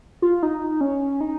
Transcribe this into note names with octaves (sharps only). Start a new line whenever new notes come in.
F4
D#4
C#4
D#4